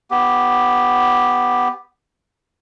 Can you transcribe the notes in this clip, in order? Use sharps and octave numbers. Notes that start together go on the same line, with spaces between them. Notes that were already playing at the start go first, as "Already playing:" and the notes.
B3 G4